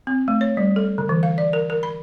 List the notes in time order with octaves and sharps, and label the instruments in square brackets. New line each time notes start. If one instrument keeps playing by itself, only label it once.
[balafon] C4
A3
C#5
G3
A4
D3
E3
F5
D5
A#4
A#4
B5